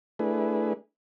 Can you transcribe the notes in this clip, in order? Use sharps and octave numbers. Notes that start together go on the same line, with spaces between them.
A3 D4 E4 G#4 B4